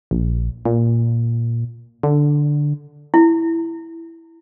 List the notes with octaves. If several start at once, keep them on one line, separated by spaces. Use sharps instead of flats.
A#1
A#2
D3
E4